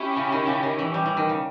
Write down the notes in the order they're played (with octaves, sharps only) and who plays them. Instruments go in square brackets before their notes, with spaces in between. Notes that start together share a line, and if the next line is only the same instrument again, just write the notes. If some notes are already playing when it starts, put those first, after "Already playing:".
Already playing: [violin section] C#4 E4 G4
[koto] C#3
D#3
C#3
D#3
E3
G3
E3
D#3
C#3